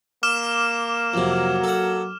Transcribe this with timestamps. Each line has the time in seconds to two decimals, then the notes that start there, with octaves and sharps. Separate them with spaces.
0.23 A#3 D6 F6 E7
1.14 F2 C3 F#3
1.64 A4 F#5